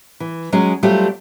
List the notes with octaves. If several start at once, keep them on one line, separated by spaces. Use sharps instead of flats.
E3
F#3 G#3 C#4 G#4
F#3 G3 A3 C4 F4 G4